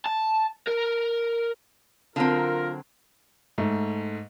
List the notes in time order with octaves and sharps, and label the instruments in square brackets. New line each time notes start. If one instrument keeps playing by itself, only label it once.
[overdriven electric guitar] A5
A#4
[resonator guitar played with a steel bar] D3 F#3 C4 [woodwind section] F4 A#4
[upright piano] G#2 A3